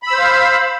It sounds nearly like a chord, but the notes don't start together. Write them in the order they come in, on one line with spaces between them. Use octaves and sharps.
B5 E6 C5 F5